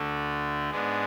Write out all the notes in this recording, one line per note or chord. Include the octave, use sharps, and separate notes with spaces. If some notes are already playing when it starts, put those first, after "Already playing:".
Already playing: D2 D3 A3
G#2 G#3 B3 D4